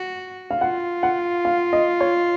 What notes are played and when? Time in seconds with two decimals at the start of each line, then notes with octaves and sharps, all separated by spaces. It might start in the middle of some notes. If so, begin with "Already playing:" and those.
Already playing: F#4
0.51 F5
0.61 F4 F#5
1.03 F#5
1.45 F5
1.73 D#5
2.01 C#5